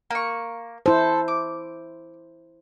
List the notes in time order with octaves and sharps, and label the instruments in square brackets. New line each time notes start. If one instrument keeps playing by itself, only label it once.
[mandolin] A#3 C#6
[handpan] E4 C5 [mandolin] A4
[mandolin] D6